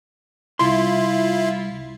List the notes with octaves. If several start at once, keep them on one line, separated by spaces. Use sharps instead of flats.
C2 E4 F4 C6